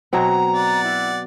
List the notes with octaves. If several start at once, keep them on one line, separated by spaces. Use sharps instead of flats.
B2 F#3 C4 A#5
D5 F#5
E4